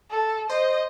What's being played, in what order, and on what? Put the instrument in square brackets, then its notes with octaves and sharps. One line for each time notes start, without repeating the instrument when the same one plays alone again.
[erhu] A4
[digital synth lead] C5 [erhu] D#5